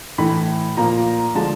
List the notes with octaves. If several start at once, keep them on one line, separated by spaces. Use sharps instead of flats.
A2 E3 A3 B5
A#2 F3 A#3 A#5
D3 F3 G#3 A5